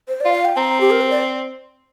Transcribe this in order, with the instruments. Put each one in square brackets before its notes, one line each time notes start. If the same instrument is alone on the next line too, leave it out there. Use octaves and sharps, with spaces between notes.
[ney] C5
[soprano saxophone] F4 [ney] D5
[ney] F5
G5
[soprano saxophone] C4 [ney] A#5
[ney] G4
A#4
C5
D5